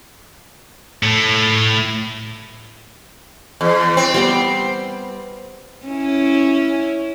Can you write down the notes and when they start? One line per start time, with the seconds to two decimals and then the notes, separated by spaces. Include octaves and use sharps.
1.03 A2
3.61 E2
3.97 C4
4.14 G3 B3 G4
5.86 C#4 E4